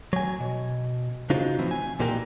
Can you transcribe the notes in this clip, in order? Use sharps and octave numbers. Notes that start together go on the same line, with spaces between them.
F#3 G#5
B2
C#3 D4 D#4 F4 F#4 C5
A2 C3 E3 F3 C4
G#5
B1 A#2 E3 A#3 G4 A#4